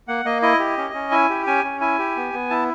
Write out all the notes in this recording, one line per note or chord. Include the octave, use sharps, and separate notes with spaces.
A#3 F#5
A#3 D#5
E4 D#5
G4
C#4
C#4
E4 G#5
G4
C#4 G#5
C#4
E4 G#5
G4
B3
B3
E4 A5